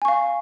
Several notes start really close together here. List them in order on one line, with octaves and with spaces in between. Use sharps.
G#5 C#6 F5